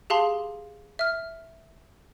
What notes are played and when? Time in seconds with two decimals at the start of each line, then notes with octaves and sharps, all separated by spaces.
0.10 G4 G#4 F5 A5 C6
0.99 E5 F6